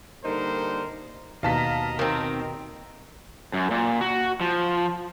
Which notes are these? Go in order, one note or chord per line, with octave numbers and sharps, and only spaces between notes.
D3 G3 A#3 D#4 A#4 C5
D#2 B2 D#5 F5 A5 A#5 B6
D#3 C4 A#4
F#2
A#2
F#4
F3